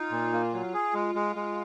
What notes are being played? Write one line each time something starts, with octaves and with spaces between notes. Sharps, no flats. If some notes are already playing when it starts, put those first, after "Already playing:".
Already playing: D#4 F4
A#2
A#3
F#3
G#4
G#3
G#3
G#3